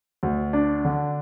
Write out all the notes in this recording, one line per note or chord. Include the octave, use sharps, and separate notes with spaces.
D2
D4
D3